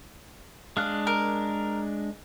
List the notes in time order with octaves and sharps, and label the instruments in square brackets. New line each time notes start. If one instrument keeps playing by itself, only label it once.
[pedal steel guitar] G#3 D4 F#6 [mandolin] F5
[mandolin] A#4